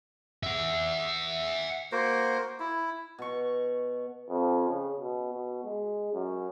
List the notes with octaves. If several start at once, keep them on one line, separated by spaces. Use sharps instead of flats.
E5 F#5
A#3 F#4 A#4 C5
E4
B2 C#6
F2
C#3
B2
B2
G#3
F#2